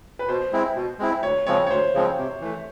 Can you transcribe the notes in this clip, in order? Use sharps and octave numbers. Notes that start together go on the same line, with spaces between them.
B4
B2 C5
G#3 C4 E4
B2
G#3 C4 E4
D2 C#5
C#3 F3 G#3 C4 C#5
C#5
D2 C5
C#3 F3 G#3 C4
C3
E3 A3